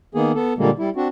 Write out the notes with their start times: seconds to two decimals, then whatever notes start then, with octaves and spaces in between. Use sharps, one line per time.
0.15 D#3 A#3 B3 G#4
0.35 B3 A4
0.58 A#2 D3 G3 G#3 A#3
0.79 G3 E4
0.96 C4 D4 F#4